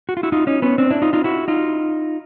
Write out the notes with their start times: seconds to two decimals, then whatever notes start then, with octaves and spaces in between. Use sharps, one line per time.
0.09 F#4
0.17 F4
0.23 E4 F#4
0.32 D#4 F4
0.47 C#4 D#4
0.62 B3 C#4
0.78 C4 D4
0.90 D4 E4
1.02 D#4 F4
1.13 D#4 F4
1.24 E4 F#4
1.48 D#4 F4